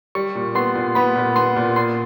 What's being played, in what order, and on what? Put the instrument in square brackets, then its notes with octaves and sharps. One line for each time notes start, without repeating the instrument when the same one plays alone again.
[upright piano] G3 [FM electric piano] C#6
[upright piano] A#2
[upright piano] B3 [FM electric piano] C6
[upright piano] A#2
[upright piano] B3 [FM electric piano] B5
[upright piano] A#2
[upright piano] B3 [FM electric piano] C6
[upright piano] A#2
[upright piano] A#2 [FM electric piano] C6